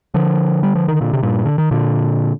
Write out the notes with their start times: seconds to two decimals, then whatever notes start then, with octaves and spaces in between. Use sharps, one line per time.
0.14 D3 F3
0.63 G3
0.75 F3
0.88 D#3
1.01 A#2 D3
1.13 C3
1.23 G2 A#2
1.45 D3
1.58 D#3
1.71 A#2 D3